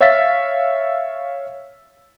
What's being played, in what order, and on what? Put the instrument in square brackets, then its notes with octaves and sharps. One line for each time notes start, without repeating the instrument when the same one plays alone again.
[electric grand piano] C#5 E5 F5 E6 A6 B6